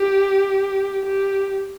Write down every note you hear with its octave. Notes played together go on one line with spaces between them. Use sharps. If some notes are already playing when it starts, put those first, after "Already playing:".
Already playing: G4
G4